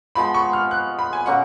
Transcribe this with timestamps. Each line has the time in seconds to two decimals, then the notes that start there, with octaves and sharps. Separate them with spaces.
0.15 F3 G#3 B3 B5
0.34 C#6
0.53 F6
0.71 F#6
0.99 B5
1.13 G#5
1.26 B2 A#3 C#4 F#5